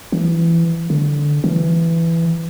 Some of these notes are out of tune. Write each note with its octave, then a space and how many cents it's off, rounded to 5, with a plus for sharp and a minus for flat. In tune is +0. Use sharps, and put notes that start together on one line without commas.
E3 +20
D3 -5
E3 +10